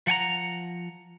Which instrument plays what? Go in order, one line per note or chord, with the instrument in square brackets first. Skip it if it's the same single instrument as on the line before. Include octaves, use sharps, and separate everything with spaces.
[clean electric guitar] F3 F#5 G#5 A#5